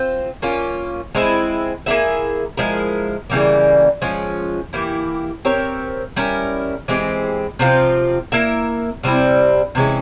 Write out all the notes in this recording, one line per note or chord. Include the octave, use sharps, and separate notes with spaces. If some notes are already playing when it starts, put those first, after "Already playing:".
Already playing: C4 F4 C5
A#3 C#4 F4
G#3 C4 E4
A#3 E4 G#4 E5
F3 G#3 E4 A#4
C#3 E3 G3 A#3
F3 G#3 C#4 F4
E3 A#3 E4 G4
C4 G4 A#4 C#5
G3 C#4 E4 A#4
E3 G#3 C4 G4
C3 F3 C4 F4
A#3 E4 A#4 E5
C3 G3 C4 E4
C3 E3 G#3 C#4